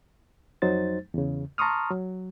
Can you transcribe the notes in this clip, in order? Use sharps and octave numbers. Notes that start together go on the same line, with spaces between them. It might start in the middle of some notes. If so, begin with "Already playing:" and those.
F2 F#3 D#4 C5 A6
E2 C#3
A5 A#5 C6 C#6 D#6 F6
F#3